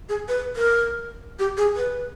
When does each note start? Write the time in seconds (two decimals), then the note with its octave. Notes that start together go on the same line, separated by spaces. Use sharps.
0.09 G#4
0.28 B4
0.56 A#4
1.39 G4
1.57 G#4
1.76 B4